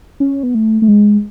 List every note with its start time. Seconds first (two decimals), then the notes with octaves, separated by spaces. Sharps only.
0.20 C#4
0.43 B3
0.55 A3
0.82 A3
0.88 G#3